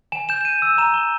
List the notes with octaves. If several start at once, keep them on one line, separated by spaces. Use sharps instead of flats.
G#5 E7
G6 E7
E7
G6 D#7
E6 E7
A#5 E7
G6 G7